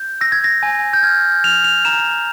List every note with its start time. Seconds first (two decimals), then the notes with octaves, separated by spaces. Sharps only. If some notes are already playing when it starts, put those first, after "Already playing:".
Already playing: G6
0.21 E6 A#6
0.32 G#6
0.44 A#6
0.63 G#5
0.93 G6
1.03 F6 G#6
1.44 F6 F7
1.64 F7
1.85 A#5 E7